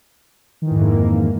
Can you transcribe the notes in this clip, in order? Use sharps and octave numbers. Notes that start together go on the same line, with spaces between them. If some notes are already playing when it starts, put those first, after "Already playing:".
F2 G#2 D#3 E3 A#3